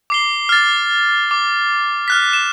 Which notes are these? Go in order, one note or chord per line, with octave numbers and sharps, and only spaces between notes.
D6 C7 G7
F6 A6
D6
F6 F#6 B6
E7